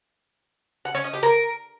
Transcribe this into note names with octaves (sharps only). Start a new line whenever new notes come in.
F#5
C#4
D#5
G4
A#4